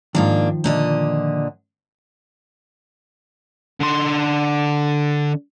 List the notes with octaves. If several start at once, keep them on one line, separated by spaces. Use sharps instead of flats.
G#2 D#3 F3 A#3 D4
A#2 D3 D#5
D3 C6